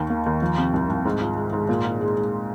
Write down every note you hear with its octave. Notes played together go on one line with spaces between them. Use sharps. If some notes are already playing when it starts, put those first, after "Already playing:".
Already playing: D#2 D#3
A#3
D#2
F3
C3
C2
C2
G#2
F4
G#3
G#2
A#2
F4
G#3
G#3